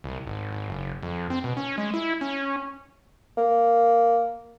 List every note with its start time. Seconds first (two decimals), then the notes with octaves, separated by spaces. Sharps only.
0.04 C2
0.27 G#1
0.52 G#1
0.69 F#1
1.03 F2
1.30 C4
1.44 B2
1.57 C#4
1.78 G#3
1.94 E4
2.21 C#4
3.37 A#3